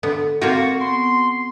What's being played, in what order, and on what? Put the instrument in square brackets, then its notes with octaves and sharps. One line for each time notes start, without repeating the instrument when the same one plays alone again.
[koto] D3 B3
[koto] A#3 F4 G5 [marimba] C4 A4 F5 [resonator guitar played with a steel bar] F#4
[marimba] B3 [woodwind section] C6